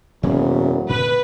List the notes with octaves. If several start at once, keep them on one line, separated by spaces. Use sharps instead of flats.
E1 F#2 C3 A#3 B3
A#2 D3 B4